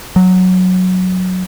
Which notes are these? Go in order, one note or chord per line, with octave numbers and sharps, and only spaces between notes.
F#3